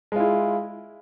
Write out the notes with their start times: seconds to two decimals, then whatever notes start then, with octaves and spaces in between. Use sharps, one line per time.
0.12 G#3
0.16 F4
0.20 E4